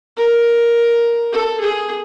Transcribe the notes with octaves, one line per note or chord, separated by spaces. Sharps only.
A#4
A4
G#4